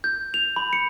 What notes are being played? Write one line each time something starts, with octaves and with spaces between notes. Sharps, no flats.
G6
F7
B5
C#7